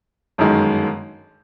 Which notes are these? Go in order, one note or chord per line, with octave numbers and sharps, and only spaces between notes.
G1 F#2 D#3 G#3